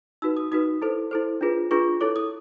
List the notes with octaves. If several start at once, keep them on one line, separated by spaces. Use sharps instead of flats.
D#4 F#4 B4 E6
D#6
D#4 F#4 B4 D#6
E4 A4 C5
E4 A4 C5
D4 F4 G#4 B4
D4 F4 G#4 B4 C#6
E4 A4 C#5 D6
D#6